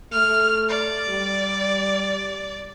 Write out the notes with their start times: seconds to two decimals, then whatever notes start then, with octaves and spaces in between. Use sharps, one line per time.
0.12 A3 F6
0.69 D5
1.09 G3